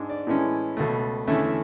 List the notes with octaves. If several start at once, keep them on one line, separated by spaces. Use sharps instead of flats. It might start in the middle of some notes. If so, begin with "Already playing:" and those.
Already playing: G#2 G#3 D4
D5
A2 E3 G#3 C#4
C#2 B2 A3
E2 D3 A3 C#4 E5